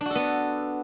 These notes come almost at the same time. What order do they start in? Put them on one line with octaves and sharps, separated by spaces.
D4 F#4 A4 B3